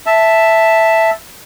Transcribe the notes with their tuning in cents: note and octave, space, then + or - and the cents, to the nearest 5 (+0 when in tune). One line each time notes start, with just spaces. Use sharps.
E5 +0 A5 +0